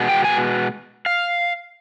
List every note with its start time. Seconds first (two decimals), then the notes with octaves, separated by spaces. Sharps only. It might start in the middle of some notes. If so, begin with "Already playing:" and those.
Already playing: B2 G#3 B3
0.09 G5
0.25 G#5
1.06 F5